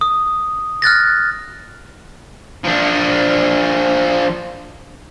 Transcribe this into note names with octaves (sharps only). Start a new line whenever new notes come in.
D#6
F6 F#6 A6 A#6
F3 D4